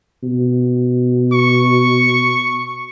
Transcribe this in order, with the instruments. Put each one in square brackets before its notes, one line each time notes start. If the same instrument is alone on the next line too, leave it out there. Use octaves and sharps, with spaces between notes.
[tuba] B2
[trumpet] C#6